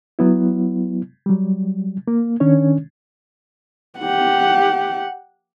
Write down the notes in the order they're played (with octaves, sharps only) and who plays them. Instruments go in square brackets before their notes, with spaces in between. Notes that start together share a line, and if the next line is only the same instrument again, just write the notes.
[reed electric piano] F#3 B3 E4
F#3 G3
A#3
D#3 C#4 D4 C#5
[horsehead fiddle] G4 F#5